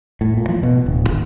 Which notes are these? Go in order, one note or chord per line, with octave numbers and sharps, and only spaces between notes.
A2
A#2
F3
B2
D1
G#1